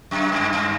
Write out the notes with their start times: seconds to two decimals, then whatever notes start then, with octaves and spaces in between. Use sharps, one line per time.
0.11 F#2
0.32 G2
0.53 G2